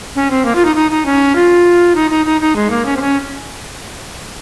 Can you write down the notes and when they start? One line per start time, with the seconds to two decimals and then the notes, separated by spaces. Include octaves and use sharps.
0.16 C#4
0.31 C4
0.45 A#3
0.55 F4
0.65 D#4
0.76 D#4
0.91 D#4
1.06 C#4
1.35 F4
1.95 D#4
2.10 D#4
2.26 D#4
2.41 D#4
2.56 G#3
2.70 A#3
2.85 C#4
2.97 C4
3.01 C#4